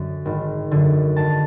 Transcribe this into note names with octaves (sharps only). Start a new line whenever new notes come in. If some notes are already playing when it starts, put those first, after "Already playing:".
Already playing: F#2 D3
G#1
F#2 D3
G#1 A5